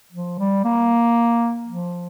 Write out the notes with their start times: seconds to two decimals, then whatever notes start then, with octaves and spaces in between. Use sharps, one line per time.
0.13 F3
0.39 G3
0.64 A#3
1.67 F3